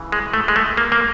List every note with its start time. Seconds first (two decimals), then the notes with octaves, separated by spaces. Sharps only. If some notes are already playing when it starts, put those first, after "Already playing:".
Already playing: C#3 E3
0.12 G#3
0.34 A3
0.48 G#3
0.56 A3
0.77 A#3
0.92 A#3